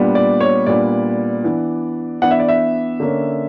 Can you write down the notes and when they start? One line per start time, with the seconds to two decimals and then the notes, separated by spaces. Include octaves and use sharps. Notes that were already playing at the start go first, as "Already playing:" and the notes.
Already playing: A#2 G3 B3 D4
0.15 D5
0.41 C#5
0.66 A#2 G3 B3 D4 D5
1.44 E3 B3 D4
2.22 E3 B3 D4 F#5
2.31 E5
2.40 D5
2.49 E5
3.00 D3 A#3 C#4